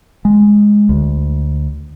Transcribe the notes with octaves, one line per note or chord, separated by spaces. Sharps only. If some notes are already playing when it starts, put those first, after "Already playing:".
G#3
D2